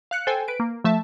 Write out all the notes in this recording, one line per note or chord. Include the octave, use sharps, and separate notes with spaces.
F5 F#6 C#7
A4 C5 G5 G#5
B4 D7
A#3
F3 A3 E5 A5